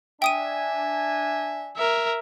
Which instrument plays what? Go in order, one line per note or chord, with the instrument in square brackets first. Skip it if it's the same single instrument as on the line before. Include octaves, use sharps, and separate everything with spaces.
[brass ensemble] D4 G#5 [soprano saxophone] E5 [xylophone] G5 D#6 D#7
[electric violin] A#4 E5